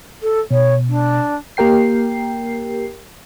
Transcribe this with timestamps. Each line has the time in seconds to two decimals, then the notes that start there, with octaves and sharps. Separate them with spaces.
0.22 A4
0.51 B2 C#5
0.88 D4
1.57 A#3 G4 A#4 G5 C7